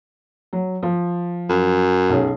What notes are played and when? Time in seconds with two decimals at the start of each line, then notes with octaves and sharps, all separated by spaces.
0.53 F#3
0.83 F3
1.49 F#2
2.09 B1 C#4 G#4